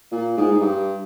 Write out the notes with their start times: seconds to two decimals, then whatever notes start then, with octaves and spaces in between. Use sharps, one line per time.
0.12 A#2
0.37 G#2
0.51 G#2
0.61 G2